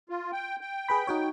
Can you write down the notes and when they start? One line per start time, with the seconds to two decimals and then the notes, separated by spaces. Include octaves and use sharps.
0.09 F4
0.32 G5
0.61 G5
0.89 G#4 B4 B5
1.07 D#4 F#4 C#5